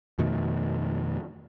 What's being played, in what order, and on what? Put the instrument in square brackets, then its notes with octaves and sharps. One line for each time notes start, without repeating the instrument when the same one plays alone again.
[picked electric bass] F2 B2 D#3 A3